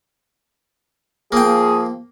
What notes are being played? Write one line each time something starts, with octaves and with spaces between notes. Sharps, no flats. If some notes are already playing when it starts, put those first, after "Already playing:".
F3 A#3 G#4 G5